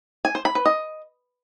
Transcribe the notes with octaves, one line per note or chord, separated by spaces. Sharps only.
G#5
C5
B5
B4
D#5